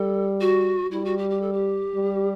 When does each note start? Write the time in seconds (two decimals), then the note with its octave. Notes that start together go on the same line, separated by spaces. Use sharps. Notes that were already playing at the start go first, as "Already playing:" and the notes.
Already playing: G3 A4
0.41 F#4
0.91 G3 E4
1.05 F#4
1.18 G4
1.30 G4
1.42 A4
1.53 G4
1.95 G3